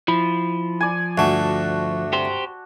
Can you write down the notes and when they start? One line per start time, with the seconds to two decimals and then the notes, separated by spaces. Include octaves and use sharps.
0.08 F3 E4 B5
0.81 D5 G#5
1.18 D2 G2 A3 F#4 A5
2.13 G4 C5